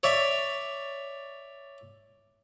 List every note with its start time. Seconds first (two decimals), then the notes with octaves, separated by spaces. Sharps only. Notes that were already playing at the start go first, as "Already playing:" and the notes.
0.03 C#5 D5 E5